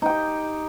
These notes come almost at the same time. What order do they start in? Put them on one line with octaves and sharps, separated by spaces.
D#4 G5 G4